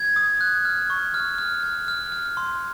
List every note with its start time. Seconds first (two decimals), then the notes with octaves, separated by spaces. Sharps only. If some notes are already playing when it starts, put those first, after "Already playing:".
Already playing: G#6
0.16 D#6
0.41 F#6
0.65 F6
0.90 C#6
1.14 F6
1.38 F6
1.63 F6
1.88 F6
2.12 F6
2.37 C6